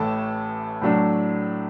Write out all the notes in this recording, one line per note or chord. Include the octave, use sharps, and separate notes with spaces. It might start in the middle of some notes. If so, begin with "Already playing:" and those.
Already playing: A1 A2 E3 A4 A5
A2 F#3 A3 D4